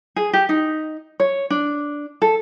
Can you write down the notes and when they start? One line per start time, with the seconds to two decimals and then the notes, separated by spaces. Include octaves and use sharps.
0.16 G#4
0.33 G4
0.49 D#4
1.20 C#5
1.50 D4
2.22 A4